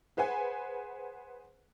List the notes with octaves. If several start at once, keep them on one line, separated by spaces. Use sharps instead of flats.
G#4 B4 C5 F#5 G#5